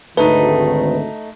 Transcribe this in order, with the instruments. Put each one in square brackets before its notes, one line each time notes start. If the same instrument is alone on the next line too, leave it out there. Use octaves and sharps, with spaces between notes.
[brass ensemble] G#1 D2 D#3 [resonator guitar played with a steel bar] A3 D#4 [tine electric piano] B4